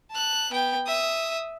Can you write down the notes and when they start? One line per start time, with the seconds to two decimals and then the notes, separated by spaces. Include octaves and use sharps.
0.11 A5 F#6
0.51 B3 G5
0.86 E5 D#6